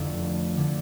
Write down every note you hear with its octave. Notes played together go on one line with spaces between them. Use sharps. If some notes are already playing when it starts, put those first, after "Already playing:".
Already playing: F1 F2 D3 A3 E4
D3 A3 E4